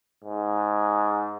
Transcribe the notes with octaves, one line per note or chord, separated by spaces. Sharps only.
G#2